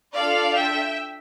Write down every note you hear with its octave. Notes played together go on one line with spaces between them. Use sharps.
D4 F4 A4 D5 F5
E5 G5